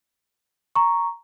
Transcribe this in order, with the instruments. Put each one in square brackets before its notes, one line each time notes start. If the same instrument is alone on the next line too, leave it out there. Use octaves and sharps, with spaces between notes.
[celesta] A#5 C#6